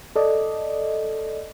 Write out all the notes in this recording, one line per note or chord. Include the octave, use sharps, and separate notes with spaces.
A4 D5 D#5